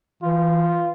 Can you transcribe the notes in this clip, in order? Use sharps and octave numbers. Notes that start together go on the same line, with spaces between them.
E3 F4